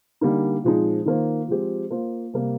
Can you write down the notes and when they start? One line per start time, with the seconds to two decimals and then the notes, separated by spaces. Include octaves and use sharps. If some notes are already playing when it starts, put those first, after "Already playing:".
0.21 D3 G3 A#3 D#4
0.64 A#2 F3 G#3 C4 D#4
1.06 D#3 A#3 F4 C5
1.48 F3 G#3 C4 G4
1.91 A#3 F4 C5
2.33 C3 G3 A#3